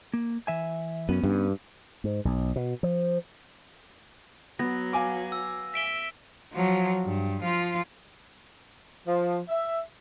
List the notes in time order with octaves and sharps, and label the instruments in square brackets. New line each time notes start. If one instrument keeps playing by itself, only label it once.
[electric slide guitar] A#3
E3 E5 G#5
[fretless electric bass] F#2 [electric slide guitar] B3 C#4
[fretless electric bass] G2
[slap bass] G#2
B1
B2
F3
[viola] F#3 [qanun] B3 [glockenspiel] A#6
[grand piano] F5 G#5 D6
[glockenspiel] E6
[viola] E5 [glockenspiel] B6 D7 G7
[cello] F3 F#3
G2
F3 F4
[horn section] F3
E5